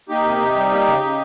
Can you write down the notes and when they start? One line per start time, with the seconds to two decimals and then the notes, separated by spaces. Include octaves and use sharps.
0.09 A#3 D#4 G4
0.24 C3
0.40 C3
0.56 G3
0.71 A#3
0.87 C#3
1.03 C#3